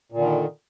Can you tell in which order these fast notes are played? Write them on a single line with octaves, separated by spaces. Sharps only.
A#2 D3 D#3